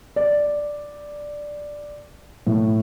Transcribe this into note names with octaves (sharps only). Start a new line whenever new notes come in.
D5
A2